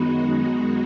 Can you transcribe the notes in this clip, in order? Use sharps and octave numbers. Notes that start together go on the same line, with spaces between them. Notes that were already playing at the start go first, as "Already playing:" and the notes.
Already playing: F#2 D#3 G#3 B3 D#4 F#4